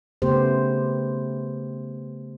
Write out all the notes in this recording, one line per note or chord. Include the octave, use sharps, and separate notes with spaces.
C#3 A3 B3 G4 C5